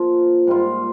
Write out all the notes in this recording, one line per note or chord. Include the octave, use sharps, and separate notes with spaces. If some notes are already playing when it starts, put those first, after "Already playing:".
Already playing: F3 A#3 F4
G#2 G3 A#3 F4